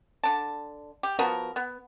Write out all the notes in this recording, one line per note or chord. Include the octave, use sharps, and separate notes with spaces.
D3 A5
G4
F3 B3 F#4 A#4
B3